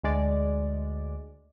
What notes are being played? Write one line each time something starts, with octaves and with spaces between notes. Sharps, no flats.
D2 G#3 D5